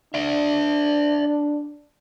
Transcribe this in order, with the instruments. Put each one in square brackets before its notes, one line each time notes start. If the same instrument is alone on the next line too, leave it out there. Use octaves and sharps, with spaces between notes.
[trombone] D4 [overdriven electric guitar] D5 E5